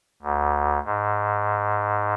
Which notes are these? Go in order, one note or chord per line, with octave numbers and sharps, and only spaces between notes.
D2
G#2